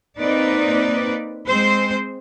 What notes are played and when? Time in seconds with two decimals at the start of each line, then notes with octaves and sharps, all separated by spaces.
0.20 A#3 C4 D#4 B4 D5
1.48 G#3 C4 C5